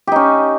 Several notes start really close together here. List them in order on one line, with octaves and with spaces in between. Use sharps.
G4 D#4 C#4